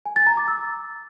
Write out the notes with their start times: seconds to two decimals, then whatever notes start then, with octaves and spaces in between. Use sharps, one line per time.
0.06 G#5
0.16 A6
0.27 A#5
0.37 D6
0.48 E6